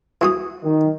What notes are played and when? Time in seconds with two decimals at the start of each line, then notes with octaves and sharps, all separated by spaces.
0.21 E3 F#4 D#6
0.63 D#3